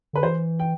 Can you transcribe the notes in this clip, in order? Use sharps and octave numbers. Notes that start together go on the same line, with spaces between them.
D3 B4
E3 C5
G5